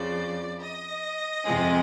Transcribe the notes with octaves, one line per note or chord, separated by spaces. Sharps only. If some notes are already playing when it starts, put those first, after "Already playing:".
Already playing: F2 C#3 F3 D5
D#5
F2 C3 F3 G#3